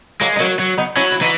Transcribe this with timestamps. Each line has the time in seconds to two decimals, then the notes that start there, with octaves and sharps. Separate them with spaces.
0.21 F#3 G#3 A#3
0.36 D#4
0.40 F#3 A#3 C#4
0.59 F#3
0.78 B3 D#4
0.96 F#3 C#4 E4
1.11 E4
1.21 E3 D#4 F#4